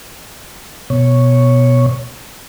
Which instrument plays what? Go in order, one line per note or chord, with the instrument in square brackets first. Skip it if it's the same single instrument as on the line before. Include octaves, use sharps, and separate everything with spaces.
[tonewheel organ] B2 C#5